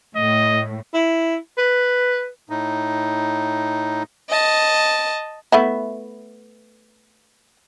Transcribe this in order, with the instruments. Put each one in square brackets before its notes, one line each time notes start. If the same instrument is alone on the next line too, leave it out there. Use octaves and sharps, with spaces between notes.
[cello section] A2 [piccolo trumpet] D#5
[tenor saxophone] E4
B4
[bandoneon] A2 D#4
[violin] D#5 A5
[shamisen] A3 B3 E4